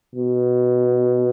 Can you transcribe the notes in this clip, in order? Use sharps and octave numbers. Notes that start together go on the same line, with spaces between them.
B2